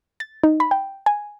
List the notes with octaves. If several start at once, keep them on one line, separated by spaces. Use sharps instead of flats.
A6
D#4
B5
G5
G#5